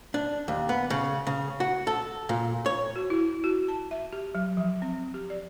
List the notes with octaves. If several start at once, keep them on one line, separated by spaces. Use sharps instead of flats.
D4
D#2
B3
C#3
C#3
F#4
A4
A#2
C#5
F#4
E4
F#4
A5
E5
G4
F#3
F3
C4
G4
D5